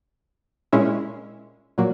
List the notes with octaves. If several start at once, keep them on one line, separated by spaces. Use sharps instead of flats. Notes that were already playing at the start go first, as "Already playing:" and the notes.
A#2 G#3 C#4 E4
A#2 F#3 A#3